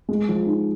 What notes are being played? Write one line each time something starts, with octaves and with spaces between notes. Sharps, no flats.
G#3
F3
D#4